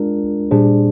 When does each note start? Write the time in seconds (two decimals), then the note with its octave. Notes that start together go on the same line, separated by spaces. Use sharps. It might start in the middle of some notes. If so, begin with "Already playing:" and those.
Already playing: G#3 D4 F4 A#4
0.51 A#2 G3 D4 G#4 C5